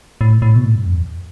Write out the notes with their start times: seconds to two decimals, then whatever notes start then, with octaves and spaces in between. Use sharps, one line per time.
0.21 A2
0.42 A2
0.56 B2
0.64 A2
0.75 G2
0.86 F2
0.97 E2